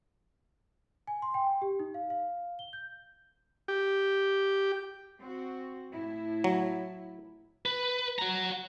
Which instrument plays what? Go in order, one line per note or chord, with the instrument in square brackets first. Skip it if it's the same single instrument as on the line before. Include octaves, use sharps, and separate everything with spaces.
[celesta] G#5
C6
G5
G4
D#4
F5
F5
G7
G6
[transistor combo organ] G4
[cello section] C4 F#4
A2 E4
[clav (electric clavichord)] F#3
[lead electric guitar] B4
F#4 A#5